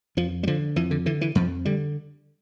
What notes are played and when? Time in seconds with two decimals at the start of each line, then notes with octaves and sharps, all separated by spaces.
0.17 F2 F3
0.43 G3
0.47 D3 F3
0.76 F2 E3
0.91 D3
1.06 D3 E3
1.21 E3
1.35 F2 F3
1.65 D3 G3